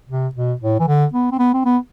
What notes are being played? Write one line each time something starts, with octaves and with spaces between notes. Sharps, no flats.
C3
B2
A2
E3
D3
B3
C4
B3
C4
B3